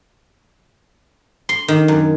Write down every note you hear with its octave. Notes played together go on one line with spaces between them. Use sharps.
C6
D#3
F#2